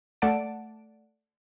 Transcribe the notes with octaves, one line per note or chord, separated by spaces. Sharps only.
A3 D5 F#5 A5 D7